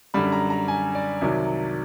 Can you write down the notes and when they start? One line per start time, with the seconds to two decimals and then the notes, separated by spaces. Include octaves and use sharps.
0.14 F#2 D3 G3 B5
0.32 A#5
0.50 A#5
0.68 G#5
0.95 D5
1.21 C2 C3 D#3 F#3